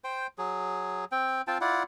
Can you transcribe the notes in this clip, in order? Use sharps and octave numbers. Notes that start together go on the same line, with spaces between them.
C5 G5
F#3 G#4
C4 G5
C4 F4 G5 A5
E4 F4 D5 F#5